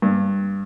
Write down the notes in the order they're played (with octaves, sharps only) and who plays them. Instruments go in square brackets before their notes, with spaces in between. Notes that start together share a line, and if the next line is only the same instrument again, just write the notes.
[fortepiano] G2